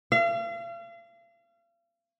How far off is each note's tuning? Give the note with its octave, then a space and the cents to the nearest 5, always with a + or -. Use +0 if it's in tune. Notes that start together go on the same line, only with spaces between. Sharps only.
F5 -40